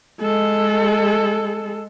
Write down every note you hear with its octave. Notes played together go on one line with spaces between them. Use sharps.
G#3 A4